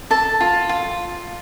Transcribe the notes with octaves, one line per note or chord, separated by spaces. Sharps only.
A4 A5
F4
F4